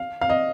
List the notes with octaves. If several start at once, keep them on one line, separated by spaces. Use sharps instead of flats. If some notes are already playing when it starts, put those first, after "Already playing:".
Already playing: F5
F5
D#5